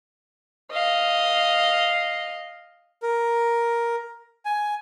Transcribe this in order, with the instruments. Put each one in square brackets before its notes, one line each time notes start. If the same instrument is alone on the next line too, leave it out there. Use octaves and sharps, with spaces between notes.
[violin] D#5 F5
[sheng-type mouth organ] A#4
G#5